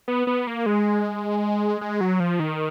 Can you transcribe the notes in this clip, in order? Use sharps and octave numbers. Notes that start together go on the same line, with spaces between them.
B3
B3
A#3
G#3
G#3
F#3
F3
D#3